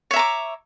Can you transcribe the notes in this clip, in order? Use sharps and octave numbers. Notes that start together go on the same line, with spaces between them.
C#5 E5 A#5 D6